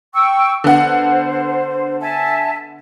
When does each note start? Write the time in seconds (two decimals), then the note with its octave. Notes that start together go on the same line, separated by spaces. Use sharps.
0.14 G5 C#6 E6
0.64 D3 B3 C5 F#5
2.00 E5 G#5 A5